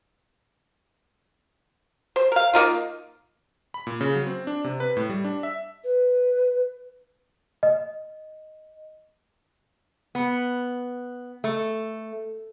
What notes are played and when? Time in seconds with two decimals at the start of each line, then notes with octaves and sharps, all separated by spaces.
2.16 C5
2.32 A#4 F5
2.53 A#3 D#4 F4
3.74 B5
3.87 A#2
4.01 C#3
4.15 F#3
4.27 C4
4.47 D4
4.64 C3
4.80 B4
4.97 A2
5.10 G3
5.25 D4
5.43 E5
5.84 B4
7.63 D#5
10.15 B3
11.44 A3